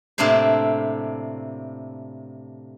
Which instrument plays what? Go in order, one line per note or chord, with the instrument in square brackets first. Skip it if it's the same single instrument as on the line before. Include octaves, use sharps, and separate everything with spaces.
[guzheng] A2 C3 A#3 D4 E4 C5